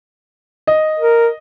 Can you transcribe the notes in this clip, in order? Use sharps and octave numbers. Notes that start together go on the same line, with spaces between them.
D#5
A#4